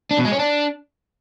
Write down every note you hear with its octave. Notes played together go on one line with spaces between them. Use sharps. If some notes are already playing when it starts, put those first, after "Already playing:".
D4
B2
G#3
C#4
D4